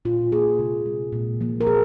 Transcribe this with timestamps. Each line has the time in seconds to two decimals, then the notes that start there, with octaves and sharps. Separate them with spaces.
0.05 A#2 F4
0.32 A#3 G#4
0.59 C3
0.86 G#3
1.12 A#2
1.41 F3 A#3
1.61 A#4
1.67 A#2 G#4